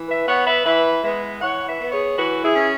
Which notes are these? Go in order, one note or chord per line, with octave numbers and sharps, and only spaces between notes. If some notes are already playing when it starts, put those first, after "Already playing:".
Already playing: E3
B4 E5
B3 C#5 F#5
B4 E5
E3 B4 E5
G#3 B3 B4 E5
E3 C#5 F#5
B4 E5
B3
G#4 C#5
E3 F#4 B4
E4 G#4
C#4